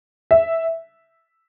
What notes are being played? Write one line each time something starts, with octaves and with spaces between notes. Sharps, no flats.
E5